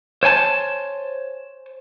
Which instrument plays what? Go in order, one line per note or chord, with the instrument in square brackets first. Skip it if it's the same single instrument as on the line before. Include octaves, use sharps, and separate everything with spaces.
[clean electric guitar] C5 C#5 G#5 A5